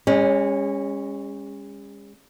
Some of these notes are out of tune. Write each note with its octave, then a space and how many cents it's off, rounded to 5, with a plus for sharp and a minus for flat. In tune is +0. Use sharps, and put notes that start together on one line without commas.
G#3 -40 C#4 +0